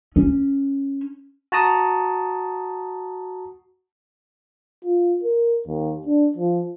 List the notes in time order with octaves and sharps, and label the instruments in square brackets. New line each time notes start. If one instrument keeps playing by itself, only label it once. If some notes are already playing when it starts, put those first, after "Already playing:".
[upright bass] C#4
[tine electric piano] F#4 A5 A#5 D#6
[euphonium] F4
A#4
D#2
D4
F3